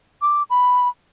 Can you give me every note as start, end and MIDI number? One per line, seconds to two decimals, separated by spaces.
0.22 0.43 86
0.50 0.88 83